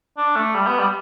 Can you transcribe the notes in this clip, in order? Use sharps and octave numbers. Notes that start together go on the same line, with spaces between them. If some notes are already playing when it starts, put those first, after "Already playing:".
D4
A3
G3
B3
G3